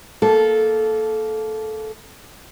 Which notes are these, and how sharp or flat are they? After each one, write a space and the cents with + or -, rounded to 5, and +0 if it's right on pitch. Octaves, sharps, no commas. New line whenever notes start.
A#3 +0 A4 -15